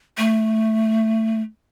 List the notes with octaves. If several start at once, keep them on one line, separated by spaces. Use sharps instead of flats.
A3